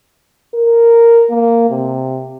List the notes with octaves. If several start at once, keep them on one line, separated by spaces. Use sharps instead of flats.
A#4
A#3
C3